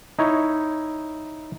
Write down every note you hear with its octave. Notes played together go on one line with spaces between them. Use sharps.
D#4 E4 C#5